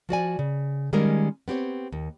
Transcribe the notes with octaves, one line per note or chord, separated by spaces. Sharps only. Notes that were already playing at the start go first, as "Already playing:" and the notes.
F3 F#4 D5 G#5
C#3
D#3 G3 G#3 A#3 C#4 A#4
B3 C4 G4 C#5
D#2